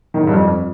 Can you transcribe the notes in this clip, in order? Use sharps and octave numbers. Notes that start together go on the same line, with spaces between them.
D#3
G#2
G2
F2